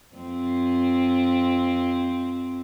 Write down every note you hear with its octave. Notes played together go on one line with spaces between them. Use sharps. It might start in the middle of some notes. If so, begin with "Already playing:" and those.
F2 C4